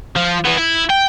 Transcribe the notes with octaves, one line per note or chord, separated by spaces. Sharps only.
F3
E3 B3
E4
G5